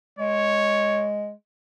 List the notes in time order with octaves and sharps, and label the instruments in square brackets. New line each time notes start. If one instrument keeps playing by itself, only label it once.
[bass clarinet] G#3 [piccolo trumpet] C#5